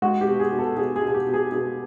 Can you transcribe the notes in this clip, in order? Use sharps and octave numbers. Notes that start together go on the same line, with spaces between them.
G#3 F#4
G4
B2
G#4
B2
A4
B2 G#4
G#4
B2
G#4
G4
B2
G#4
B2 G#4